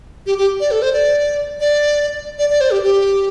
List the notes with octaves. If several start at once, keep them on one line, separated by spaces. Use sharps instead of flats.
G4
G4
D5
A4
C5
D5
D5
D5
D5
C5
G4
G4